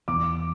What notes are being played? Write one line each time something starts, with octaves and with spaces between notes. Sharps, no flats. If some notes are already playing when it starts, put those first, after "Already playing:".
E2 C#3 E3 B3 D6